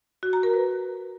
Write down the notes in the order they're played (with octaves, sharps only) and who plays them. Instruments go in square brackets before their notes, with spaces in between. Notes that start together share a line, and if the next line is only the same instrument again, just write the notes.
[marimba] F#4
A#5
A#4
B4